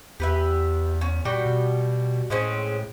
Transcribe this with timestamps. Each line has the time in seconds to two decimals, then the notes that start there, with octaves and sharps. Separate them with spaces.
0.20 E2 G4 B4 E5
1.01 C#4
1.25 A#2 G3 F#4 G5
1.46 B2
2.30 A2 G#3 C4 C#4